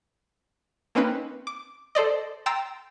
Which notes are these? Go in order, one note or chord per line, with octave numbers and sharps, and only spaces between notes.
A#3 C4 C#4 D#4 B4
D6
A4 C5 D5 D#5
G5 A#5 C6 E6 A6 A#6